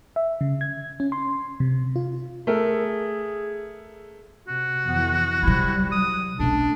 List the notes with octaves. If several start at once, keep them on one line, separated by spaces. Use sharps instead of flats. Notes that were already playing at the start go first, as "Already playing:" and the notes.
E5
C#3
G#6
C#4
C6
C3
F4
A3 G#4 A#4
C3 F#4
F2 E3 B3
C3 F#3 G3 E4
D#6
B1 A3 C#4 D4